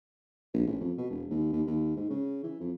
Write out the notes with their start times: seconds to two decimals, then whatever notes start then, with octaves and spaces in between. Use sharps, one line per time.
0.54 A#1
0.67 A1
0.80 F2
0.98 B2
1.10 E1
1.30 D#2
1.53 D#2
1.67 D#2
1.96 G#2
2.10 C#3
2.44 E3
2.60 F2